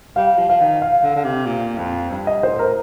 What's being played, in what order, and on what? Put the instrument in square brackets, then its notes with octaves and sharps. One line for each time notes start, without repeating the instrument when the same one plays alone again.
[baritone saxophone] G3 [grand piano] F5
[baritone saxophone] F3
[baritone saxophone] F3 [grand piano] F5
[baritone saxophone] D#3
[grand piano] F5
[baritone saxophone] D3
D3
C3
A#2
F2
G2
[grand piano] D#5
[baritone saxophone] A2 [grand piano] C5
[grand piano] A#4